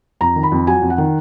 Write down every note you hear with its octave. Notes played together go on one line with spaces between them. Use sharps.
F2 A#5
D#3
B5
F2
F#3 G#5
F2
F#5
D#3